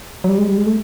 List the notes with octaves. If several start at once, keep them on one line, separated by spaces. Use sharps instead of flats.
F#3
G3
G#3
G3
G#3
A3